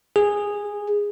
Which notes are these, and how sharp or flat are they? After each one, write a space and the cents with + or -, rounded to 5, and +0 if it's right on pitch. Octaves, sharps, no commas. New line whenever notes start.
G#4 -10